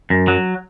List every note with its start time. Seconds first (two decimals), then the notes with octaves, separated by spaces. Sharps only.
0.10 F#2
0.28 F#3